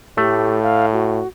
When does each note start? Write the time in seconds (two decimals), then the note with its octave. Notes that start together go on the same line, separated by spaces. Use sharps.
0.18 A2 A3 G4
0.63 F5
0.92 F#4